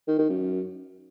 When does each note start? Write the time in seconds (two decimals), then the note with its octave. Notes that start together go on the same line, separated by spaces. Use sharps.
0.08 D#3
0.19 D#3
0.30 F#2